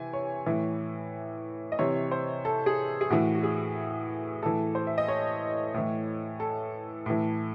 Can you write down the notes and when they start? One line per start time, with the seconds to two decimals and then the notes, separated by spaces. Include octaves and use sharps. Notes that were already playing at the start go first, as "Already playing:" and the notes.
Already playing: C3 E3 G#5
0.13 C#5
0.46 A2 E3
1.72 D#5
1.79 C3 E3 C#5
2.11 C5
2.45 A4
2.66 G#4
3.01 G#4
3.10 A2 E3 F#4
3.35 F#4
3.43 G#4
4.43 A2 E3 A4
4.75 C5
4.87 E5
4.98 D#5
5.08 C#5
5.74 A2 E3
6.40 A4
7.06 A2 E3